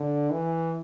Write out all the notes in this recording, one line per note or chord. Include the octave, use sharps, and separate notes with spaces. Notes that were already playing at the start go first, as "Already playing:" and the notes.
Already playing: D3
E3